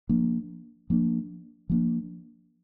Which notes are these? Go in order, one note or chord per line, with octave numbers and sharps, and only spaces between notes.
F3 A#3 D4
F3 A#3 D4
F3 A#3 D4